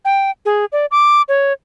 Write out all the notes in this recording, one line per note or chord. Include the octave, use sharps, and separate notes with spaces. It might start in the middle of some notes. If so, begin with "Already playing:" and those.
G5
G#4
D5
D6
C#5